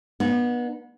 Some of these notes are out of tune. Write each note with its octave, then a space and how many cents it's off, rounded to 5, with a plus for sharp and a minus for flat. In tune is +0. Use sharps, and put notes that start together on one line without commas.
B3 -25 D4 +40